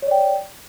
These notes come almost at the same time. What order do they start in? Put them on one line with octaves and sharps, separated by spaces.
C#5 D5 G5